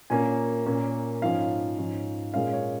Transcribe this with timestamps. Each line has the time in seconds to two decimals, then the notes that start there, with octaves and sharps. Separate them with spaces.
0.10 A#2 A#3 C#4 G#5
0.66 A#2 A#3 C#4
1.22 G#2 F3 C#4 F5
1.78 G#2 F3 C#4
2.34 A#2 G#3 C#4 F5
2.53 C#5